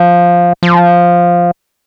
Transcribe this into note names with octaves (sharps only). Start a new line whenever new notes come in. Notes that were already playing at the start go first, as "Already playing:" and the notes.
Already playing: F3
F3